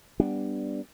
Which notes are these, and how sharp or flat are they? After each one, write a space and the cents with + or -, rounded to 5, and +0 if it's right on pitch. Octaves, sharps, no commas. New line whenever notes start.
G3 +0 B3 +0 D4 +0